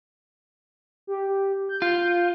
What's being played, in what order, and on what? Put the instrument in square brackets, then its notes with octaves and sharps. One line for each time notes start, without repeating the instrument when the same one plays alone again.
[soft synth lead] G4
G6
[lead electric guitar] F4